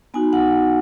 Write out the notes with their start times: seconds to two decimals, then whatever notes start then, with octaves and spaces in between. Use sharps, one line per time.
0.14 B3 D#4 F#4 G#5
0.33 F#5